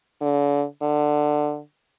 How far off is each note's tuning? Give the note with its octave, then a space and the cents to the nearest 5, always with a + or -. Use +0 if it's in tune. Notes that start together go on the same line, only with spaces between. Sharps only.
D3 -40
D3 +15